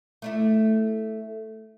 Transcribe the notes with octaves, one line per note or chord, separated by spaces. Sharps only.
A3 D4 E4